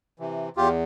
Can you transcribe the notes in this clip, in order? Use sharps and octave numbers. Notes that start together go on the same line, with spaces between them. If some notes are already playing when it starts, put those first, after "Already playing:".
C3 E3
E2 F4 G4